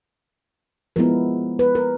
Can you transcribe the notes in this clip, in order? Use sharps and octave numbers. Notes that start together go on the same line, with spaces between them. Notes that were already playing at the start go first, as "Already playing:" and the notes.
F3 G#3 B3 E4 A#4
B4
A#4